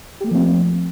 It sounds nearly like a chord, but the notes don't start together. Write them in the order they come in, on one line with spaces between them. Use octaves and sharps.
G4 A3 A#3 F3 C4